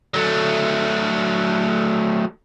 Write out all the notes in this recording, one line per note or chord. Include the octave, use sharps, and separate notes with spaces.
F#3 A3